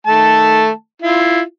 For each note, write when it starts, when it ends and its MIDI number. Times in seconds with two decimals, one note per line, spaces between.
0.07 0.71 51
0.07 0.71 57
0.07 0.71 81
1.02 1.41 64
1.02 1.41 65